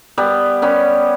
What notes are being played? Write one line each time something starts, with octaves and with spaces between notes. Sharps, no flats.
G3 B3
G3 B3 C#4